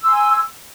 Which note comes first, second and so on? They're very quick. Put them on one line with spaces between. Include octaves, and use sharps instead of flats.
E6 C6 G#5